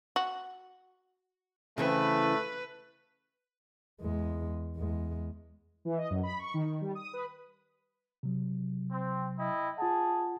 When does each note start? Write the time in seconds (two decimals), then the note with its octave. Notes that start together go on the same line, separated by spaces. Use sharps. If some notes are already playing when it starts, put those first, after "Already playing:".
0.16 F#4
1.78 C#3 E3 A3 C4 B4
4.01 E2 G#3
4.76 E2 G#3
5.85 E3
5.98 D#5
6.10 F#2
6.23 B5
6.39 C#6
6.54 D#3
6.65 D#3
6.81 G3
6.95 D#6
7.13 B4
8.23 C3 F#3
8.92 C4
9.39 E4 D#5 G5
9.78 F4 G#4 F#5 A5